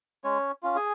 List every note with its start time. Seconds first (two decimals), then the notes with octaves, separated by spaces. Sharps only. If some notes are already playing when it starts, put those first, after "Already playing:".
0.24 G#3 C#4 C#5
0.63 C#4 F4
0.75 G#4 G#5